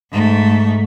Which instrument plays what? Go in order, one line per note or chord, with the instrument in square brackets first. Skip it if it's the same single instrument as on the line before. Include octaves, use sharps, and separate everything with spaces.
[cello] G#2 A3